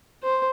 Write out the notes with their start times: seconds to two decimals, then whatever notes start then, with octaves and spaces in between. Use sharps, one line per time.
0.23 C5